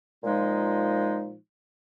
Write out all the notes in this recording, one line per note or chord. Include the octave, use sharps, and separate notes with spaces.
A#2 F3 G#3 D#4